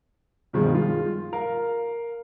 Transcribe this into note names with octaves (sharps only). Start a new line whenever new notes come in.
G2 B2 D#3 F3 G3 G#3
F4
A#4 F5